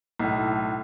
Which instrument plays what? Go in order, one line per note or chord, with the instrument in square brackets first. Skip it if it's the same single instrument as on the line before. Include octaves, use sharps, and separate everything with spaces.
[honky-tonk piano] B1 A2